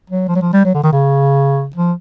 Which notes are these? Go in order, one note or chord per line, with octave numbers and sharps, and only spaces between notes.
F#3
F3
F#3
F3
G3
F#3
D3
D#3
C#3
F3